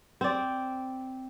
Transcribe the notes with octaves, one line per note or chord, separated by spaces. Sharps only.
C4 D5